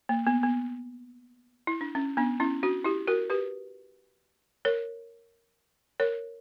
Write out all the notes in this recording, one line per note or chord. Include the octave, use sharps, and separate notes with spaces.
A#3
B3
B3
E4
D4
C#4
B3 D4
C#4 E4
D4 F#4
E4 G4
F#4 A#4
G4 B4
A#4 C#5
A#4 C#5